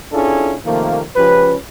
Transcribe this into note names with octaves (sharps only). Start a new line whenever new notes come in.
C#4 D4 E4 F4 G#4 A4
C3 D#3 F3 A3 A#3
C#2 F3 C#4 G4 B4